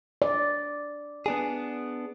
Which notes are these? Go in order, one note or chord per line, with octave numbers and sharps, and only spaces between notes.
D5
B3 D4 G#4